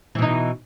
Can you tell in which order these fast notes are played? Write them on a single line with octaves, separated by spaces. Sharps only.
E3 B2 D#4